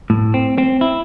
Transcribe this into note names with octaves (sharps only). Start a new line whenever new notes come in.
A2
C4
C4
E4